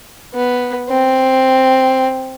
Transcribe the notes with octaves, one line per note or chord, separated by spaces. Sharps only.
B3
C4